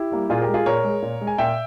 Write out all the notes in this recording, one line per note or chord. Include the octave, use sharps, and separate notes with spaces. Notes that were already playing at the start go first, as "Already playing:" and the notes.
Already playing: E4 G4
G3 A#3
A#2 F4 G#4
G4 A#4
G#3
F4 G#4
A#2 A#4 C#5
G#3
A#2
G#3
G#5
A#2 E5 G5